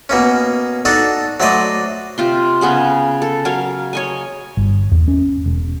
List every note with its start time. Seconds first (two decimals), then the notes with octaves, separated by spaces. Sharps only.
0.09 B2 A#3 C#4
0.85 D4 D#4 F#4 A4
1.40 F#3 A3 C5 D5 D#5
2.18 C3 F4 C6
2.61 C#3 B3 G#4 B5
3.22 A4
3.45 F#3 A#4 C#5 F5
3.93 C#5 D#5 G#5
4.57 G1
4.91 E2
5.08 C#4
5.46 E1